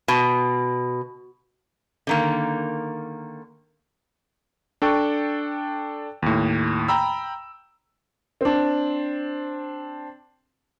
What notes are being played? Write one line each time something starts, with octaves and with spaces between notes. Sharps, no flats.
B2
D3 D#3 A#3
D4 A4 G5 C#6
D#2 A2
G5 A#5 B5 E6
C4 D4